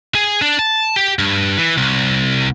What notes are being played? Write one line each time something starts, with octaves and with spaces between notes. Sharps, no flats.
G#4
D4
A5
G4
G2
E3
C2